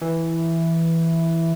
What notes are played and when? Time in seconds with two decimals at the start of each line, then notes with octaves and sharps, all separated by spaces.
0.01 E3